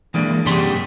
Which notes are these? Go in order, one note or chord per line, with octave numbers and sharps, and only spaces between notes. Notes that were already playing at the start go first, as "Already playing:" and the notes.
E3 G#3 A#3 D4
F#2 C3 G3 G#4 C6